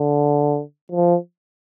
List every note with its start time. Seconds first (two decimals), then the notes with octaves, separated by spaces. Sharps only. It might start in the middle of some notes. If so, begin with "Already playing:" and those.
Already playing: D3
0.92 F3